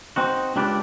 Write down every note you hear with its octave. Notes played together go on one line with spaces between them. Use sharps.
C4 D#4 F#4
C#2 D4 G4 B4 D5